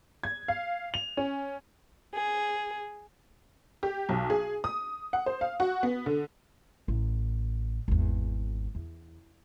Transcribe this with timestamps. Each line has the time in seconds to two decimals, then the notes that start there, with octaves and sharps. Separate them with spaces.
0.23 G#6
0.48 F5
0.94 F7
1.17 C#4
2.14 G#4
3.83 G4
4.09 B1
4.30 G#4
4.64 D#6
5.13 F#5
5.26 C5
5.41 F5
5.60 F#4
5.83 B3
6.06 D3
6.88 A1
7.88 G#1 E2
8.75 E2